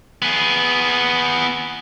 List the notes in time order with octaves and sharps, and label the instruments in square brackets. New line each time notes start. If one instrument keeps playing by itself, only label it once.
[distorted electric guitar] B3 G#4